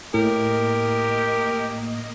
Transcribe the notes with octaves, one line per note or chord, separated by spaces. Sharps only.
A2 A#3 G4 A#4 D#5